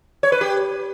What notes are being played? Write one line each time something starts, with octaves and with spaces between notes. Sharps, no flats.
C#5
B4
G4